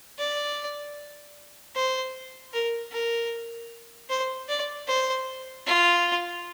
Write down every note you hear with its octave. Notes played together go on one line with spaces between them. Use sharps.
D5
C5
A#4
A#4
C5
D5
C5
F4